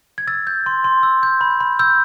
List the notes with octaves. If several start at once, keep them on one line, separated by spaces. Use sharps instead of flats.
G#6
E6 A6
G6
C6
C6
E6
G6
B5
B5
E6 G6